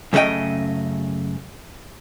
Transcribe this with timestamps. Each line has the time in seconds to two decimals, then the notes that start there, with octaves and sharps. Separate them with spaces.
0.13 F#2 C#3 A3 D4 D#5 G5